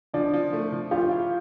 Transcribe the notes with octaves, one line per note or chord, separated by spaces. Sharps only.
F3 D4 D5
F3
A3
F3
F4 G4 F5
E4